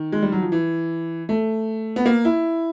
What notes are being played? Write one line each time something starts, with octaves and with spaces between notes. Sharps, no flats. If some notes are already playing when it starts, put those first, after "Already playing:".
Already playing: D#3
G#3
G3
F#3
F3
E3
A3
B3
A#3
E4